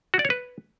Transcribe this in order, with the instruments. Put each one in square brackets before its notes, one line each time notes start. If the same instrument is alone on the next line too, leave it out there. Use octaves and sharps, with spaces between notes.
[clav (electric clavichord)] F#4
D5
C#5
B4